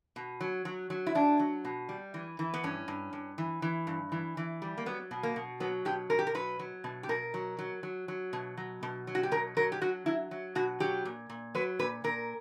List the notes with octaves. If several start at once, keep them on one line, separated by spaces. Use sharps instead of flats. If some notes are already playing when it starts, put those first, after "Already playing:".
B2
F#3
F#3
F#3
E4
F#3 D4
F#3
B2
G3
E3
E3
B3
G2 C#4
G2
G2
E3
E3
G2
E3
E3
G3
A#3
F#3 B3
B2
A#3
B2
F#3 B3
B2 G4
B2 A#4
G4
A#4
F#3 B4
F#3
B2
G4
B2 A#4
F#3
F#3
F#3
F#3
B2
F#3
B2
F#3
F#4
G4
B2 A#4
F#3 A#4
G4
F#3 F#4
F#3 E4
F#3
B2 F#4
F#3 G4
A#2
A#2
F#3 B4
A#2 B4
A#2 A#4